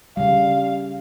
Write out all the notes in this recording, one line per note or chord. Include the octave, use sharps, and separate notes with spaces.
C#3 G3 F5